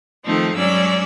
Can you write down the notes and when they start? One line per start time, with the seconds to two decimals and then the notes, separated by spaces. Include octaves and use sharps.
0.23 D#3 F3 A3 C4 D#4
0.54 G2 F#3 G#3 C#4 D5 E6